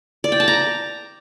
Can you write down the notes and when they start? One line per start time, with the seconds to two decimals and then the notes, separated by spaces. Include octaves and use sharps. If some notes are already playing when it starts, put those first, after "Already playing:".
0.24 D5
0.32 G5
0.40 A5
0.48 A#5